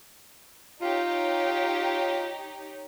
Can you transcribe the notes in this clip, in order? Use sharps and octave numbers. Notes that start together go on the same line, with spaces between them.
D#4 F4 G4 C#5